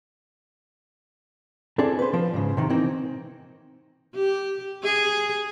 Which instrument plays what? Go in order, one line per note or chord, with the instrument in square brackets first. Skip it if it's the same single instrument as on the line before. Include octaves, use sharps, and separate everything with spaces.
[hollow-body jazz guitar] C4 D4 E4 G#4 A4
B4 C5
F3
G#2 C#3
C3 D#3
E3 A#3 C4 D#4
[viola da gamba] G4
G#4